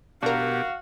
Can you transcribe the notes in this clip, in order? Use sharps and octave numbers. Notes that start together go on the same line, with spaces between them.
B2 D4 F#4 G4 A#4 F5 F#5